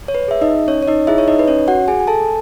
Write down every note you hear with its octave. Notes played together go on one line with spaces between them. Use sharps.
C#5
B4
G#4 E5
D#4 D#5
C#4 C#5
C#5
D#4 D#5
E4 G#4 E5
C#5
D#4 D#5
B4
C#4 C#5
F#4 F#5
G#4 G#5
G#5
A4 A5